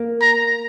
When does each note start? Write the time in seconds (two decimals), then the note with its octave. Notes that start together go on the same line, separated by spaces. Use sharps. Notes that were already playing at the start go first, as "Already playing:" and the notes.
Already playing: A#3
0.21 A#5